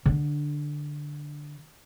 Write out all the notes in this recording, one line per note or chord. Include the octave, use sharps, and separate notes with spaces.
D3 D4